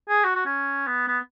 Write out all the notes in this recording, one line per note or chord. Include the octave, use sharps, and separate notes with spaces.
G#4
F#4
F#4
C#4
B3
B3